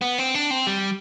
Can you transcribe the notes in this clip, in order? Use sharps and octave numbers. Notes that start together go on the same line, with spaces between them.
B3
C4
D4
C4
G3